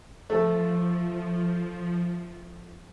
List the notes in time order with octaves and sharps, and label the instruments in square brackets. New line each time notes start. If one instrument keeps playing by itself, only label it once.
[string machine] F3 [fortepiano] A3 A4